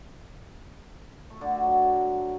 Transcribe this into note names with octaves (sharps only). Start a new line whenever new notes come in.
A3
D3
F#4
F#3